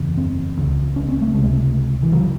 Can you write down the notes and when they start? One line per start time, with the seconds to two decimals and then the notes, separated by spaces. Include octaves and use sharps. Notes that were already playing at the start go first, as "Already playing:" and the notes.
Already playing: F#1 E2 C#3
0.17 C4
0.57 C#2 C#3
0.96 C#4
1.08 C4
1.22 A3
1.34 C#2 C3 G#3
2.03 E3
2.12 C#3 F#3